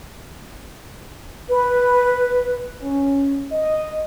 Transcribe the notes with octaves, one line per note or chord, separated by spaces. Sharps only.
B4
C#4
D#5